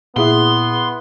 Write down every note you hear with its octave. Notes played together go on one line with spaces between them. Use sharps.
A#2 B3 E4 G#4 B4 E5 C6 D#6